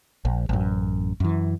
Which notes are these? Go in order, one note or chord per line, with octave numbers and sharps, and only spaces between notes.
A#1
A1 F#2
F#2 E3